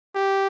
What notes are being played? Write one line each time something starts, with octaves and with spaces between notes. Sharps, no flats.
G4